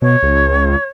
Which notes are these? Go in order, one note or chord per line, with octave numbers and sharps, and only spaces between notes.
B2 C#5
C#2